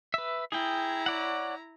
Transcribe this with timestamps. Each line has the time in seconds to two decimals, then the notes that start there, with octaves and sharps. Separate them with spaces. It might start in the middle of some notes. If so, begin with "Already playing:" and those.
0.14 B4 E5
0.52 E4 G#4 G5 A#5
1.06 C#5 D5 F#5